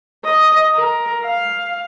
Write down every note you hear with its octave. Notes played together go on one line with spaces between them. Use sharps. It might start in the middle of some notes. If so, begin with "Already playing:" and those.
D#5
A#4
F5